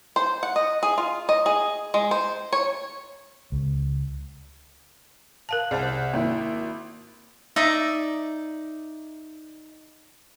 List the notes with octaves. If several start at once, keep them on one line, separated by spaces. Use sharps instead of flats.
C5
F#5
D#5
G#4
F4
D#5
G#4
G#3
C5
C#5
C#2
A#4 F5 A5
C2 G#4 C5 A5
G#1 A#3 E4
D#4 D5 E5